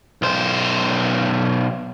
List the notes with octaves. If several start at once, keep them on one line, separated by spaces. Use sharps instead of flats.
B1 C5